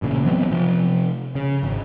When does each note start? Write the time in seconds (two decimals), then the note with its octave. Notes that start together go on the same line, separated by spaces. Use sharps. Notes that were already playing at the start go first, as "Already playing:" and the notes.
0.02 A1 A#2 C#3
0.25 E3 F#3 B3 C4
0.51 C3 F3
1.35 C#3
1.63 G#1